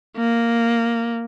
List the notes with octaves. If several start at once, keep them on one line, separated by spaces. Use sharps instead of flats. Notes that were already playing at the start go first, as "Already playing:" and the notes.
A#3